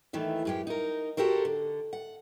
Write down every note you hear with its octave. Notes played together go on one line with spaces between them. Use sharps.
D#2 D#3 E3 A3
F#2 G#3 G4
D#4 A#4
F#4 G4 A4 A#4 C5
D3
F#5